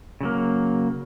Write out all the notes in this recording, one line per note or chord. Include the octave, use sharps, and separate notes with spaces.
C#3 F#3 A#3